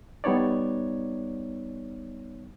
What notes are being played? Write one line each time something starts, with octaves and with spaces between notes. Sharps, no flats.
G3 B3 D#4 C#5 D5